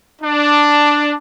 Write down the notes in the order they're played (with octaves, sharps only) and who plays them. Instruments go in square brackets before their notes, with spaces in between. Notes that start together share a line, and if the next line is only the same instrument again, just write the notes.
[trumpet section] D4